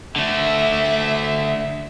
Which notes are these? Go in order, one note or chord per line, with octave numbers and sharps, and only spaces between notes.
D3 A3 E5